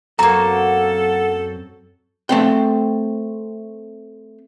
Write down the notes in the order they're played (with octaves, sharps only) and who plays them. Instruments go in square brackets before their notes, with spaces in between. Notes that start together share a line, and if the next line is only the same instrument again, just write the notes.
[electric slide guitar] F#2 F#3 C4 [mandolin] A#3 F#4 [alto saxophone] A4 [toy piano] A#5
[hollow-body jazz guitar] A3 C4 G5